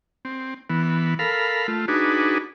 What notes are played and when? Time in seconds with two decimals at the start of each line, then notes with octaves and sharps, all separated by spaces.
0.25 C4
0.70 E3 B3
1.19 A4 A#4 F5 B5
1.68 A3 F4
1.88 D4 D#4 F#4 G#4 B4